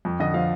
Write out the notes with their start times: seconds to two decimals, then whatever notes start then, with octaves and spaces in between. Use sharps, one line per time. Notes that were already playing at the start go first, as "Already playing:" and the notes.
0.05 F2
0.20 D3 D#5
0.34 F3 F5